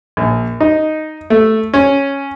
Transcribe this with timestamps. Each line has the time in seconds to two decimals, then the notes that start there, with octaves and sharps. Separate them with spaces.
0.17 A#1
0.60 D#4
1.30 A3
1.74 C#4